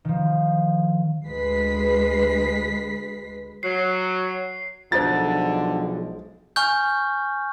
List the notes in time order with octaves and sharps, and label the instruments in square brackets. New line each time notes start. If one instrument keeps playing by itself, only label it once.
[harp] D#3 F3
[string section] D2 G#3 B4 B6 C7
[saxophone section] F#3 [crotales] C7
[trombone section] B1 F3 G#3 [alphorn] D3 [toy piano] F4 A4 C5 [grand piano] A6
[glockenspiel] G#5 C#6 F6 G6